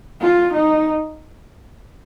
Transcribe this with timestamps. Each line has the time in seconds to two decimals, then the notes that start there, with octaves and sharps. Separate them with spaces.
0.20 F4
0.53 D#4